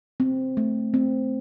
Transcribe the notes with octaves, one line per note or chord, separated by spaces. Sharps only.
C4
A3
C4